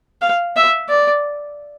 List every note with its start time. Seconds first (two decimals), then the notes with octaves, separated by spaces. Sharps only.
0.22 F5
0.56 E5
0.89 D5